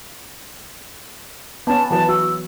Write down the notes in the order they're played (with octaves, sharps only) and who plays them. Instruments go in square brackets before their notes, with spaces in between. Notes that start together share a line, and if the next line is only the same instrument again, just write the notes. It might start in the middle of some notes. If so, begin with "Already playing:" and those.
[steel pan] B3 C#4 [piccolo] A5
[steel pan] E3 F#3 B4 [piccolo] A5
[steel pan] F#4 [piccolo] E6